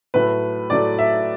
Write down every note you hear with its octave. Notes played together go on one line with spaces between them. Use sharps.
A2 F#3 A3 B4
A2 F#3 A3 D5
E5